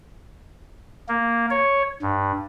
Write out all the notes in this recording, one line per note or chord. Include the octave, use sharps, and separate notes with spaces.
A#3
C#5
G2